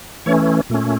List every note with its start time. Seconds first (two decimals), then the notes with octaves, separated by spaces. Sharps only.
0.26 E3 A3 C#4 C#5
0.70 A#2 A3 C#4